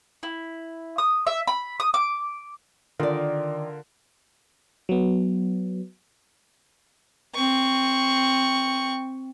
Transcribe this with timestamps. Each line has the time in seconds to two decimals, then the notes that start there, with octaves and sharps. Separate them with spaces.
0.23 E4
0.98 D#6
1.27 E5
1.47 B5
1.80 D#6
1.94 D6
2.99 D3 D#3 F4 A#4 D5
4.89 F#3 B3
7.35 C4 C#6